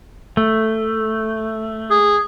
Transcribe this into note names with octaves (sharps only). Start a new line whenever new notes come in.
A3
G#4